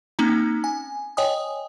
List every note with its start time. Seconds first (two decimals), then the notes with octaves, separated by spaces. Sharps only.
0.19 A#3 C4 C#4 D#4 A#5
0.64 G#5
1.17 C#5 D#5 G5 G#5 D#6